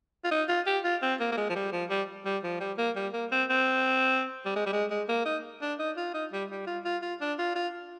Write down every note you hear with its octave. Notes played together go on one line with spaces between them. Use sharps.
F4
D#4
F4
G4
F4
C4
A#3
A#3
G#3
F3
G3
F3
G3
G3
F3
G3
A#3
G3
A#3
C4
C4
G3
G#3
G3
G#3
G#3
A#3
D#4
D4
D#4
F4
D#4
G3
G3
F4
F4
F4
D4
F4
F4